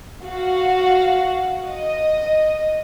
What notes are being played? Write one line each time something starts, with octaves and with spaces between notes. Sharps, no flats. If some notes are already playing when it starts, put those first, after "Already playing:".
F#4 F5
D#5